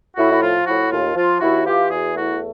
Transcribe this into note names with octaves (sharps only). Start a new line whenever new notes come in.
A2 E4 F#4
E4
F3 F4
A2 E4 F#4
D#2 F4
F3 F4
D#2 E4 F#4
E3 F4 G4
E2 F#4 G#4
A3 E4 F#4